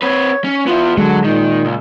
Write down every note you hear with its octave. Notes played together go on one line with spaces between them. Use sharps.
C4 B4 C#5
C#4
B3 E4 F4
D3 F#3 G#3
A#2 D#3
C#2